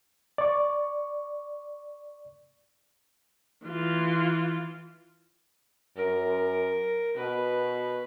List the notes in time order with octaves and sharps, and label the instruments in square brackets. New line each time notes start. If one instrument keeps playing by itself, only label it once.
[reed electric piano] D5 C#6
[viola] E3 F4
[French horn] F#2 [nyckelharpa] A#4
[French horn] B2 [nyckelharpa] B4